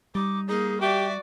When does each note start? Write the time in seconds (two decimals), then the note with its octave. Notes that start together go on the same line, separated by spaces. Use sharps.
0.15 G3 D#4 D6
0.48 A#3 D#4 G#4
0.81 F#4 G4 D5 E5